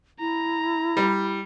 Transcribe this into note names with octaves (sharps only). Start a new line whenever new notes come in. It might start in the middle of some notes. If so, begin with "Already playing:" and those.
E4 A#5
G3